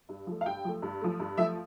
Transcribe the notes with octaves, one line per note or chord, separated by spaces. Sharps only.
G2
F3 A3
F5
G2 G5
F3 A3
G2
F3 A3
G2
F3 A3 E5